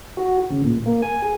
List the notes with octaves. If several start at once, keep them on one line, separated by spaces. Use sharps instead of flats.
F#4
C#3
A#2
A#3
G#5
G#4